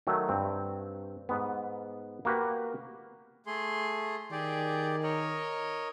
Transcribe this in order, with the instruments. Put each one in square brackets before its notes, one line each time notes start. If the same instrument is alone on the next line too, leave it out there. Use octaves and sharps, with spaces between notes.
[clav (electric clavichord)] D#3 F#3 A3
G2 C4
G#2 B3
A#3 F#4 G4 B4
[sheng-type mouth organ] A3 G#4 C6
[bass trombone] D#3 [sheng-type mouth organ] G4 G#4 D5
[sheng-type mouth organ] A#4 C#5 D#5